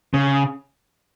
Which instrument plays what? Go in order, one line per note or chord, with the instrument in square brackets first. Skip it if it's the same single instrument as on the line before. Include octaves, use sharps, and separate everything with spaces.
[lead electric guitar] C#3